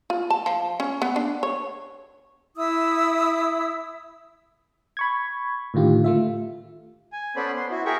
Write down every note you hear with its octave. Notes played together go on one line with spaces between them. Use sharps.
F4
A5
F3
C#4
B3
D4
C#5
E4 D#6 E6
B5 C#6 G#6
A2 D3 D#3 F4 G4
A3 F4 E5
G#5
B3 C#4 A4 C5 D5 B5
B3 C6
E4 F#4
G#4 A#4 E5 G5 C#6